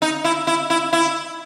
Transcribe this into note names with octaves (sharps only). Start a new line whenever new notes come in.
D#4
E4
E4
E4
E4